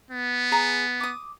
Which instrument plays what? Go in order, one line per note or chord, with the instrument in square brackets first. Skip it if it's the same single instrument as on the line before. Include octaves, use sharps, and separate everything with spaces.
[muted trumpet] B3
[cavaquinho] G#4 A#5
D6 D#6